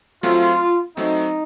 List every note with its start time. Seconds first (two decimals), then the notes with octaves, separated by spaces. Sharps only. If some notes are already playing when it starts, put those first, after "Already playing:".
0.23 F#3 A3 C4 F4
0.97 F#3 A3 C4 D#4